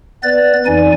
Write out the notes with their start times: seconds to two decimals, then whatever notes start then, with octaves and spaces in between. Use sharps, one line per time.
0.23 B3 B4 D5 A6
0.66 F2 E3 D#4 D5 G#5